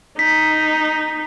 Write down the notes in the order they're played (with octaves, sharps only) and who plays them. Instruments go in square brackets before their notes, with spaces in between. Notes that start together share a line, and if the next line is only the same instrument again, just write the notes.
[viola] D#4 [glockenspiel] B6